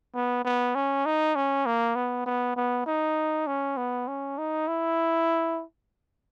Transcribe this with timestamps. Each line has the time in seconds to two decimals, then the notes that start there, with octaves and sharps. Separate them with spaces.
0.15 B3
0.45 B3
0.75 C#4
1.06 D#4
1.36 C#4
1.66 A#3
1.96 B3
2.26 B3
2.56 B3
2.86 D#4
3.47 C#4
3.77 B3
4.08 C#4
4.38 D#4
4.68 E4